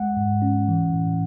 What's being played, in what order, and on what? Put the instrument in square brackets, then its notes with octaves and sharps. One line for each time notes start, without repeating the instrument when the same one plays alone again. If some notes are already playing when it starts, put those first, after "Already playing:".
Already playing: [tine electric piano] G#3 F#5
G#2
C#4
E3
A2